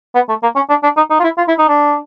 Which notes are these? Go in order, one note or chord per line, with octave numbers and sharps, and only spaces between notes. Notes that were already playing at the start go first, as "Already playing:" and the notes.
B3
A3
A#3
C#4
D4
D4
D#4
D#4
F4
E4
F4
E4
D#4
D4